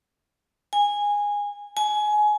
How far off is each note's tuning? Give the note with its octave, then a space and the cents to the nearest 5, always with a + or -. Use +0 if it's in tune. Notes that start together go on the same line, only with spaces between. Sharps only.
G#5 -15
G#5 +20